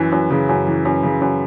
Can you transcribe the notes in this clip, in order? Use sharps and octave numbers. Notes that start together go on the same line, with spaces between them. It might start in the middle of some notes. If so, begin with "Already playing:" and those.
Already playing: F#2 E3
F#2
C#3
F#2
E3
F#2
C#3
F#2